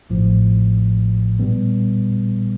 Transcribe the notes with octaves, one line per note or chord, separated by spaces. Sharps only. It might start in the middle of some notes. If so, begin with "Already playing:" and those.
A1 A2 F3
A#2 G3 B3